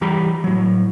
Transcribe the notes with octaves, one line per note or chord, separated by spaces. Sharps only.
E3 G3 G4 A#5 B5
A2 F#3